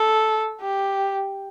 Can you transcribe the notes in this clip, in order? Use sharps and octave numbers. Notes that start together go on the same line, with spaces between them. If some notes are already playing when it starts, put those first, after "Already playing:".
Already playing: A4
G4